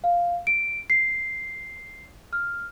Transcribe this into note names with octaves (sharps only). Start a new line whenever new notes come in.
F5
D7
C7
F6